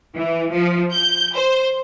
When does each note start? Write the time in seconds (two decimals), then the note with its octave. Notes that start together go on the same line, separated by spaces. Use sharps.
0.15 E3
0.53 F3
0.93 G6
1.35 C5